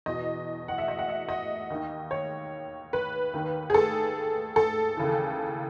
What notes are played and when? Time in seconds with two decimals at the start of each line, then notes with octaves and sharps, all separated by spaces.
0.06 E2 B2 D#5
0.68 F#5
0.78 E5
0.88 D#5
0.99 F#5
1.09 E5
1.29 D#5
1.70 D#2 D#3
2.11 C#5
2.93 B4
3.33 D#2 D#3
3.70 G#4
3.74 A4
4.56 A4
4.97 D#2 C#3 E3